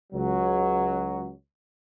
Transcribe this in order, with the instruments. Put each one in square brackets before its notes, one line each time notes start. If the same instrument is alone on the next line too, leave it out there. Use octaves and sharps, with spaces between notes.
[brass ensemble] C#2 F#3